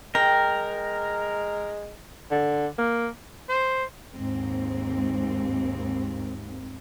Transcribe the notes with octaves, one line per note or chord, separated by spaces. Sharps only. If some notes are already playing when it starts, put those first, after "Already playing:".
G#3 A#4 G5
D3
A#3
C5
D#2 G#2 C4